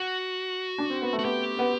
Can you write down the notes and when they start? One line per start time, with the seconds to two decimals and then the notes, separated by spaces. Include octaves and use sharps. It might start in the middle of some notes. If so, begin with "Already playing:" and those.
Already playing: F#4
0.78 D4
0.90 C4
1.02 B3
1.13 A3
1.19 F#4
1.24 B3 G4
1.59 B3